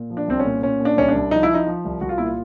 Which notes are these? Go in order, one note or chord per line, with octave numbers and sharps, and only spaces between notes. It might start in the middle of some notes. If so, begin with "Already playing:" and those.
Already playing: A#2
F3
D4
C2 C4
C#4
A#2
A#2 C#4
A#2
D4
C2 C#4
D4
C2
F3 D#4
E4
F3 D#4
F3
C2
C2 F#4
F4
A#2 E4
F4